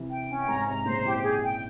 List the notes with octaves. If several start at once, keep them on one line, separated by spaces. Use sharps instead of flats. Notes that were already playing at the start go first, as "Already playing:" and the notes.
Already playing: C3 E3
G5
C#4
G#2 C3 A#5
G#2 C3 A#5
A#2 C#3 C5
C3 E3 G4
G#4
G5